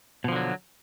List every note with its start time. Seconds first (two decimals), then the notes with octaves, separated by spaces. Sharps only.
0.24 B2
0.28 F3
0.32 D3
0.36 F#3